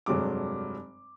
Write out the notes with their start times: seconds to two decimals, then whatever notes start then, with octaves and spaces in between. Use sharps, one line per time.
0.06 F1 G2 F#3 G#3 D6